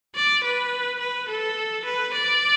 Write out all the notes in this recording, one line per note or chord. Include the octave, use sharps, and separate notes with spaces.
D5
B4
B4
A4
B4
D5